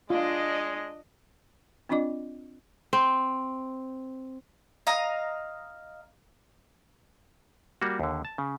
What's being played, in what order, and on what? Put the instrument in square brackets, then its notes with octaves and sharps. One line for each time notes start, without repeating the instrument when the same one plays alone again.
[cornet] G#3 [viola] D4 D#5 [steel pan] F4
[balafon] C4 D4 F4 D5 D#5 D6
[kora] C4
[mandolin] D#5 F5 A#5 D#6
[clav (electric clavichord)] G3 A#3 F#4
D#2 D3
A5
C#3